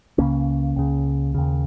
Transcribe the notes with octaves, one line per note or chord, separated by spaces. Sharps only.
C#2 C#3 A#3 C#4
C#2 C#3
D#2 C#3